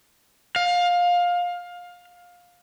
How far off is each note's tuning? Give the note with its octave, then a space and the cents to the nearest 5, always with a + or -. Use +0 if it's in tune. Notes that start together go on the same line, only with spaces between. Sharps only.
F5 +20